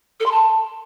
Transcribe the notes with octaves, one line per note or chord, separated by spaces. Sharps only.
A4
C6
A5